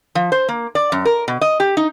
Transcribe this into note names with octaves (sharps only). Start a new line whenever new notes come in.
F3
C5
A#3
D5
F#2
A#4
B2
D#5
G4
D#4